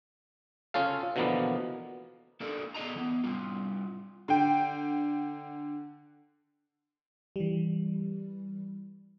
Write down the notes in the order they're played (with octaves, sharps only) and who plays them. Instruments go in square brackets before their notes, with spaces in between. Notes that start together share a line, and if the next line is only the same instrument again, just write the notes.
[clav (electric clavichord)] C#4 F4 A4 F5
B2 D3 E3 F3 A#3 B3
[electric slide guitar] A#3 D4 A4 A#4 D5
B3 G#4 D5 D#5 A5 A#5
E3 B3
G3 C4 F4
[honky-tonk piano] D3 G5
[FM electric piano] E3 G3